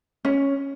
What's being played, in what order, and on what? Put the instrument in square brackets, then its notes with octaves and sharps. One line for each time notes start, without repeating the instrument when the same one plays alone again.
[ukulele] C#4